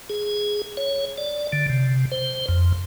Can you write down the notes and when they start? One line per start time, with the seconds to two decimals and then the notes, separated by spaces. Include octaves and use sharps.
0.10 G#4
0.77 C#5
1.18 D5
1.53 D3
1.69 C3
2.12 C5
2.48 F2